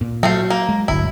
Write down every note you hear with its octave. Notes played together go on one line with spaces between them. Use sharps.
A#2
F#3 A3 C5 F5
A#3
G#3
D1 G1 D2 E4